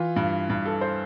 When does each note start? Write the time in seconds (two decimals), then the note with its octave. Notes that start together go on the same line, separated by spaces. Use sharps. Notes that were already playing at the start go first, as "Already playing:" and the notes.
Already playing: E3 F4
0.16 G2
0.49 G2
0.66 A4
0.81 C5